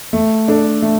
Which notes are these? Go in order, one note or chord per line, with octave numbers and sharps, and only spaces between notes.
A3
D4 A4 D5
A3